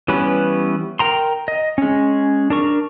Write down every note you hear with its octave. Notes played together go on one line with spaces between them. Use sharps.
E3 G3 B3 C#4 B4
A#4 G5 A#5 C6
D#5
G#3 C#4
D4 A#4 C#6